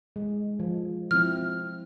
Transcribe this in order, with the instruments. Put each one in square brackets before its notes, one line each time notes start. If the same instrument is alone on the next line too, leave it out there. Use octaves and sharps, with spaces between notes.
[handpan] G#3
F3
[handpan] F3 C4 [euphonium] E4 [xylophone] F6